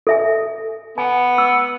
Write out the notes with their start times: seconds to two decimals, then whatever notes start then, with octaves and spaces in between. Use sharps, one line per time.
0.07 A4 E5 G#5
0.98 B3 G#5
1.38 E6